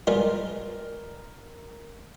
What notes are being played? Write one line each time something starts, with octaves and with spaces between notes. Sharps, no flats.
G3 G#3 F4 A#4